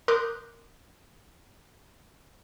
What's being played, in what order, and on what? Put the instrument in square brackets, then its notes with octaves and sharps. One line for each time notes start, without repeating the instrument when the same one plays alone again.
[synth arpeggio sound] A#4 C6 D6 D#6 F#6 G6